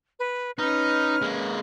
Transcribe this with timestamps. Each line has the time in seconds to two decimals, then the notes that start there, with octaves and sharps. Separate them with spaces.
0.19 B4
0.59 C#4 D#4 B4 F6
1.22 G#3 A#3